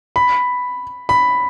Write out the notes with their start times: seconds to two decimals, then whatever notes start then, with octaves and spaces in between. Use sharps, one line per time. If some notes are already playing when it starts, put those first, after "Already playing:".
0.16 B5
1.09 B5